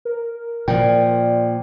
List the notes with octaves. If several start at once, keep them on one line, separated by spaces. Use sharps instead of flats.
A#4
A#2 F3 D5 G5